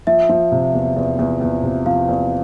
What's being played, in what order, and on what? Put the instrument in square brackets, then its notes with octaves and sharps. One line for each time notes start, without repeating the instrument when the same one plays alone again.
[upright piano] F3 [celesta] E5
[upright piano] F3
C3
E2
E2
E2
E2
C3
[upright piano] F3 [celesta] F5
[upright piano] E2